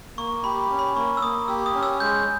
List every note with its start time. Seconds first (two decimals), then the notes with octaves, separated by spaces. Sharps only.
0.17 A#3 C#6
0.44 G4 B5
0.71 C#4
0.79 B5
0.96 A#3 C#6
1.17 E6
1.22 A#3 D#6
1.48 G4 E6
1.66 D#6
1.74 C#4
1.83 E6
2.00 G#3 G6